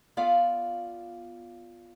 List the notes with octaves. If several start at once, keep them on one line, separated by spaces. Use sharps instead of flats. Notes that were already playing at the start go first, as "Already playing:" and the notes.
B3 F4 D5 F5